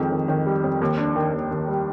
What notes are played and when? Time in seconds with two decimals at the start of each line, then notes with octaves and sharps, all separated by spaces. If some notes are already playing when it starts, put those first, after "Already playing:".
Already playing: F2 D#3 G#3
0.11 D#3
0.28 D#3
0.46 G3
0.64 F2
0.81 D#2
0.98 D4
1.16 D#3
1.33 D#2
1.51 D#2
1.68 G3